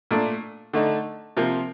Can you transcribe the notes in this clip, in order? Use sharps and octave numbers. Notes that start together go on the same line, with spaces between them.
A#2 A3 D4
D3 A3 D#4
C3 F3 A#3